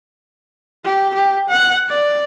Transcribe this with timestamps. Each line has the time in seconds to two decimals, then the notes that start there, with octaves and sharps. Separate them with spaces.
0.84 G4
1.14 G4
1.49 F#5
1.88 D5